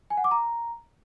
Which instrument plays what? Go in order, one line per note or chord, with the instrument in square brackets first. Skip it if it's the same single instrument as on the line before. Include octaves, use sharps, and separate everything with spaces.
[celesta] G#5
F#5
D6
A#5